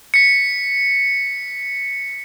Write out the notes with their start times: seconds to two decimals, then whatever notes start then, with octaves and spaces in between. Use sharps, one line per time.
0.14 B6 C#7